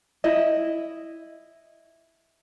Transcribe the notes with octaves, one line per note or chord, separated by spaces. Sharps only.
E4 D#5